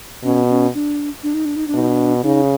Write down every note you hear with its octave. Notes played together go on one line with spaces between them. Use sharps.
B2 C#4
C#4
D4
D4
D#4
D4
D#4
D4
B2 D#4
D4
C#3 D#4